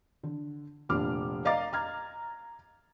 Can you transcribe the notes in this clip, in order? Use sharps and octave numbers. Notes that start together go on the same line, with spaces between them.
D3
F1 A#2 D4 F4 D6 F6
D5 D#5 F5 A#5 D6 A6
A#5 F6 G#6